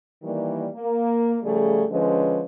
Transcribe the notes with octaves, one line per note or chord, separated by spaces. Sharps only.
D#3 E3 G3 A#3 D5
A#3
C#3 F3 G3 A3 G#4
D3 F3 G#3 C#4 B4